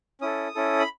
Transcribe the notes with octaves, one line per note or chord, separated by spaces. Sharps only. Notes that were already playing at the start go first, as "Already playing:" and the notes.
C#4 E4 A4 D#6
C#4 E4 A4
B5